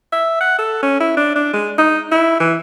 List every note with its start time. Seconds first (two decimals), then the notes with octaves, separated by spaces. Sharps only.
0.12 E5
0.41 F#5
0.58 A4
0.83 C#4
1.00 E4
1.17 D4
1.35 D4
1.53 G#3
1.78 D#4
2.11 E4
2.40 E3